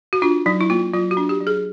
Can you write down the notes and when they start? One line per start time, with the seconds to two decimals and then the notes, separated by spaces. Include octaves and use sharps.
0.13 F#4
0.22 D4 F4
0.46 F#3 D#4
0.61 E4
0.70 A#3 F4
0.93 F#3 F4
1.11 F#4
1.17 D4
1.29 G4
1.40 F#3
1.47 G#4